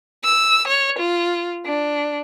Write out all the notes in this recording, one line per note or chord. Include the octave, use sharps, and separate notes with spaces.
E6
C#5
F4
D4